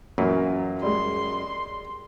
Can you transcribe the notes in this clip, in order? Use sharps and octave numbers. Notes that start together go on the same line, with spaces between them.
F#2 A#2 E3 A#3
G3 G#3 C6